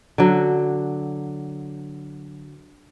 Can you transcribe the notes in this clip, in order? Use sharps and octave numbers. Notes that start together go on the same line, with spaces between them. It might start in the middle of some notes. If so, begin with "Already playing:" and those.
D3 F#3